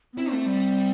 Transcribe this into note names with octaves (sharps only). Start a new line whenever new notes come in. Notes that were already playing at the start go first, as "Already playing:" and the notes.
B3
C4 E4
A3
G3